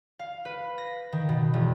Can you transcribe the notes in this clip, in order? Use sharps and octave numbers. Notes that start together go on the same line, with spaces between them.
F5
B4
A#6
D#3
B2
E1